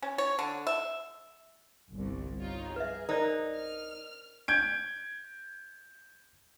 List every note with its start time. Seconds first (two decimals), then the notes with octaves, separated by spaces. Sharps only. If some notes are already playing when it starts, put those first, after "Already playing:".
0.02 C#4
0.18 C#5
0.39 D3
0.67 E5
1.92 G1 C2
2.41 D#4 F4 C#5
2.76 G#4 B4 E5
3.09 D#4 A#4 C5 D5
3.56 F6
4.48 G6 G#6 D7